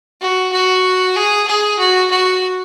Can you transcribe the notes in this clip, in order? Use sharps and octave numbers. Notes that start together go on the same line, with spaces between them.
F#4
F#4
G#4
G#4
F#4
F#4